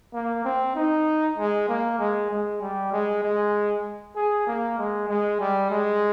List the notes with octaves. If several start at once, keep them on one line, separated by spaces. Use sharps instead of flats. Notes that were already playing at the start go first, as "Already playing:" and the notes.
A#3
C4
D#4
G#3
A#3
G#3
G#3
G3
G#3
G#3
G#4
A#3
G#3
G#3
G3
G#3